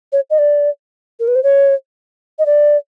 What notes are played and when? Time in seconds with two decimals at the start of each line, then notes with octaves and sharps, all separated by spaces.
0.13 C#5
0.30 D#5
0.39 D5
1.20 A#4
1.28 B4
1.35 C5
1.43 C#5
2.39 D#5
2.46 D5